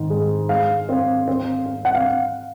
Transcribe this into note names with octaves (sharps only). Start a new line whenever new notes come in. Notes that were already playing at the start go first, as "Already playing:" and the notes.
Already playing: G#2 D#3
G#3
G#3 F5
C4
C4
C4
F#5
F5